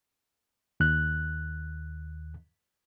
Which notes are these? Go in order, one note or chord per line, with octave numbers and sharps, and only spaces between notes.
D#2 F#6